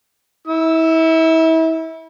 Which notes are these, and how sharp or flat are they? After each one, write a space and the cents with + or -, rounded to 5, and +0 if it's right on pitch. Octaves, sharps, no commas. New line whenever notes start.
E4 -35 E6 +0